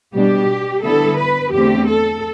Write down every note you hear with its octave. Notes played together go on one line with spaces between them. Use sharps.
B2 G3 D4 G4
D3 G3 B3 E4 A4
B4
E2 D3 A3 C4 G4
A4